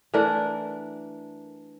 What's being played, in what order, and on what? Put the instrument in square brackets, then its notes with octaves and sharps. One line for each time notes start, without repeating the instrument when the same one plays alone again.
[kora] E3 A3 D4 A#4